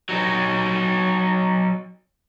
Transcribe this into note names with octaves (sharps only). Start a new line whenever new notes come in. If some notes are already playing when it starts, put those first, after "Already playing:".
F#3 D#4